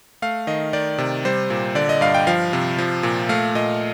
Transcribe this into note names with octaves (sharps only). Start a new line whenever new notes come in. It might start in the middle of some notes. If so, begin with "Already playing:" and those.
A3 F5
D#3 D#5
D#3 D5
C3
G3 C5
A#2
D3 D5
D#5
G2 F5
G5
F3 F5
C3
F3
A#2
A3 F5
A#2 D#5